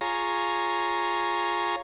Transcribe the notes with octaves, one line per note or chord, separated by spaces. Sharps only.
F4 G#4 C#5 A#5